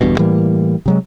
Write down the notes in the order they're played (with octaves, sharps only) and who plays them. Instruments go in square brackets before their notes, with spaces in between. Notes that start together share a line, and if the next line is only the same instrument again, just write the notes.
[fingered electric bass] G1 E2 G2 B2
A2 E3 G3 A#3
C3 F#3 G#3